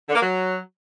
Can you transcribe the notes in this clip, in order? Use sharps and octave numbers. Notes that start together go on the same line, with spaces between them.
D3
A#3
F#3